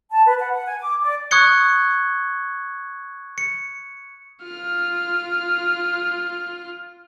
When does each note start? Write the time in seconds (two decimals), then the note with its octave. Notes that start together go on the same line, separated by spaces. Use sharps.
0.11 A5
0.25 B4
0.39 F#5
0.54 F#5
0.66 G#5
0.80 D6
1.02 D5
1.31 C#6 D#6 F#6 G#6 C#7 G7
3.38 C#7
4.43 F4 F6